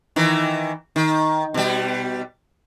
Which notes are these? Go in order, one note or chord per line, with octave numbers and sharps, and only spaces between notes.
D#3 E3
D#3
B2 G3